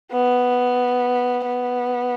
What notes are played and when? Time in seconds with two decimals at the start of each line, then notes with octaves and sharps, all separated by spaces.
0.12 B3
1.46 B3